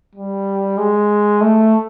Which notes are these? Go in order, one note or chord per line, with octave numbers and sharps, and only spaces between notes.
G3
G#3
A3